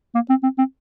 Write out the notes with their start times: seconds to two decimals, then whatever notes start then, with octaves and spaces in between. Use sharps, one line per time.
0.15 A#3
0.29 C4
0.43 C4
0.58 C4